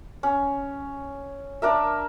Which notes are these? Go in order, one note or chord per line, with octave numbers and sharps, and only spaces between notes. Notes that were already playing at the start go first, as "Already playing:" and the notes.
C#4
D4 A#4 E5